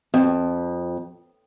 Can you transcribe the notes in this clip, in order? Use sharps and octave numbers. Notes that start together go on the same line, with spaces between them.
F2